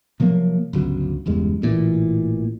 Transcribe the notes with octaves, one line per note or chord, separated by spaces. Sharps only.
C3 F3 F#3 A#3
G1 C#2 F#3
F#1 E2 G2 G#3
A1 A#2 E3